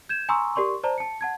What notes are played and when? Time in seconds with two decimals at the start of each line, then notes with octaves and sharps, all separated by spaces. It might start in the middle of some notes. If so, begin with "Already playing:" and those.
0.09 G6 G#6 E7
0.29 G#5 A#5 C6 C#6 D#6 E6
0.55 G4 A#4 D5 C6 C#6
0.83 C5 D5 A5 A#5
0.98 A5 C#7
1.21 F#5 A5 G#6